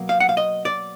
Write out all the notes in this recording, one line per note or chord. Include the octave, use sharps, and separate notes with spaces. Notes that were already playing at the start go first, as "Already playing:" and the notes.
Already playing: B2 F#3 A#3
F5
F#5
F5
D#5
D5